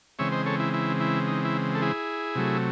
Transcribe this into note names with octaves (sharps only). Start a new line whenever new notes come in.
C#3 E3 G#3 C4 C#5 E5
C5 D#5
A4 C#5
E4
E4
E4
D#4
E4
A4
E4 G#4
C3 F#3 A3